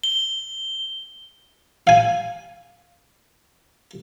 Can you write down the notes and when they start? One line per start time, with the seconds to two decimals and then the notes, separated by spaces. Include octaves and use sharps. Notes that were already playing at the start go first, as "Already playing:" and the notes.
0.04 G7
1.87 F5 G#5